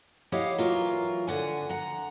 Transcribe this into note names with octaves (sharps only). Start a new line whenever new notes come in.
E4 G4 C#5 D#5 F5 F#5
E3 F#3 F4 A#4
D3 F#5 G#5
F#5 A#5